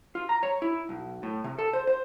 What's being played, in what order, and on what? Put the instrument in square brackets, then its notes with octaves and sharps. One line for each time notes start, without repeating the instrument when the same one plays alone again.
[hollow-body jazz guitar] F4
A#5
C#5
E4
B1
A2
C3
A4
C5
C5